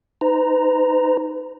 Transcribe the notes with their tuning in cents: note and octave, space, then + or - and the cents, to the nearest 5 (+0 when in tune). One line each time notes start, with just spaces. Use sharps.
D#4 +0 B4 +45 A#5 +0